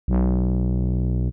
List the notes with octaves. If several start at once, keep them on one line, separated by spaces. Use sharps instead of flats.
B1